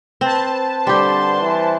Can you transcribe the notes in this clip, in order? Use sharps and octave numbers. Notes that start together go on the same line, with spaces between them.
C4 B4 C5 A5
D3 G3 G4 C6
E3